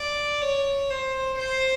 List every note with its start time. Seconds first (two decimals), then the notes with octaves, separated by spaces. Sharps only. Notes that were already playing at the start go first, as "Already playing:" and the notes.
Already playing: D5
0.41 C#5
0.90 C5
1.38 C5